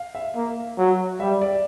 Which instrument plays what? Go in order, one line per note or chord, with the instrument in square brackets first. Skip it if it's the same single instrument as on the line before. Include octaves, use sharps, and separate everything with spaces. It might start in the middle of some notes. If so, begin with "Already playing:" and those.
Already playing: [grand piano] F5
E5
[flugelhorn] A#3
F#3
[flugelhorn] G3 [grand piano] E5
[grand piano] D5